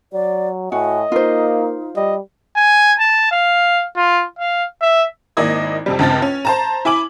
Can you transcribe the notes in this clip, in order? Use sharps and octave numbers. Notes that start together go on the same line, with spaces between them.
F#3 D5
A2 F#4 D#5 G#5
A#3 D#4 F4 C5
G3 D#5
G#5
A5
F5
F4
F5
E5
G#1 A#3 E4 D5 D#5 G#6
F2 C3 G3
C#2 G2 C4 A6
C#4
C5 A5 A#5
E4 G#5 D6 F#7